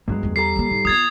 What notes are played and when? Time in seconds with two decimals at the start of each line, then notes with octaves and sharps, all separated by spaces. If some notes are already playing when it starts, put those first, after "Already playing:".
0.08 G2 F#3 G#3 B3 E4
0.23 E2 C#4
0.36 G3 A4 A#5 C7
0.56 A#3 C#4
0.71 G#2
0.85 B3 F4 D#6 G#6 A6